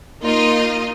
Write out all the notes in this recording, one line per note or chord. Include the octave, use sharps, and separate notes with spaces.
A#3 D#4 F4 D#5